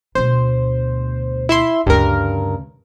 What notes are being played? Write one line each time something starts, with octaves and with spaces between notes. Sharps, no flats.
D2 B2 C5
E4 E5 C6
D2 G2 C#3 A#4